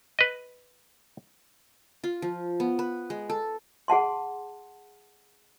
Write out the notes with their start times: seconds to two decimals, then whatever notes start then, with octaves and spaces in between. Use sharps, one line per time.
0.19 B4 D#5
2.04 F4
2.22 F3
2.60 B3
2.79 B4
3.10 G#3
3.29 A4
3.88 G#4 F#5 A5 C6